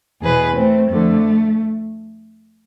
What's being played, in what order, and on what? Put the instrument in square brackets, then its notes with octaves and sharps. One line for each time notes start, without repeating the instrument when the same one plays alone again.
[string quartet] E2 B2 G#4 B4
A3 C4
F2 D3 A3